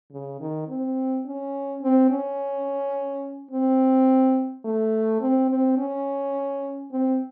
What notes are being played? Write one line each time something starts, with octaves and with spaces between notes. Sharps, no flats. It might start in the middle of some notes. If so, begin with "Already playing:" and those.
C#3
D#3
C4
C#4
C4
C#4
C4
A3
C4
C4
C#4
C4